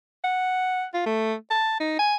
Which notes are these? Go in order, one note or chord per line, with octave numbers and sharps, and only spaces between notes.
F#5
F4
A3
A5
D#4
G#5